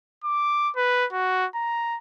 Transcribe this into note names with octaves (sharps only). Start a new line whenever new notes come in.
D6
B4
F#4
A#5